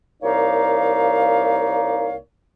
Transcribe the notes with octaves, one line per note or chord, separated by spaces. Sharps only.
C2 A#3 D#4 C#5 D5 F5